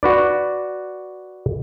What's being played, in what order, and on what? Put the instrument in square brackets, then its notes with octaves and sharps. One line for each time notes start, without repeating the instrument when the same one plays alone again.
[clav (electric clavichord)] F#4 B4 D5